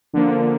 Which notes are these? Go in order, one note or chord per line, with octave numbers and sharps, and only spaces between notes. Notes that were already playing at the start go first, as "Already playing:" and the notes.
D3 F3 A#3